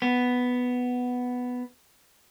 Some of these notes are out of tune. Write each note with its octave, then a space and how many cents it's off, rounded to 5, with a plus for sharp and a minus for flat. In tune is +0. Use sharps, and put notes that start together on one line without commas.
B3 +5